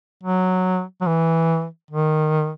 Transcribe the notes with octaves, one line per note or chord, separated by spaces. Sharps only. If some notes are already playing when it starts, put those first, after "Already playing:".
F#3
F#3
E3
D#3